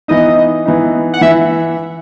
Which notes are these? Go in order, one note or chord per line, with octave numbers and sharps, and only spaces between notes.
E3 B3 D#4 D#5
E3 B3 D#4
F#5
E3 E5